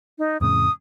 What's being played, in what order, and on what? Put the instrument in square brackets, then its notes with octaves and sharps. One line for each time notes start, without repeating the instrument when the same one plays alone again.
[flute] D#4
[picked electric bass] F2 A2 C#3 [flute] D#6